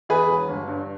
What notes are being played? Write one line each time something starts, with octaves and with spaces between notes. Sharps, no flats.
E2 G#4 B4
E1
G1
G2